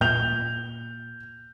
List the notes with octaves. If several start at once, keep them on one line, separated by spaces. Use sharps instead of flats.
A#2 G6 F7